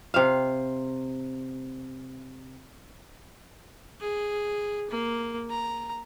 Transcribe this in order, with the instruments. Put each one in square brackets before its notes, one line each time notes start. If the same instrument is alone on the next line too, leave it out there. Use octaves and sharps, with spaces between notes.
[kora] C3 F5
[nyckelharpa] G#4
A#3
A#5